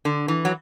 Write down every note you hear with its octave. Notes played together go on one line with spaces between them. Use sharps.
D3
E3
F#3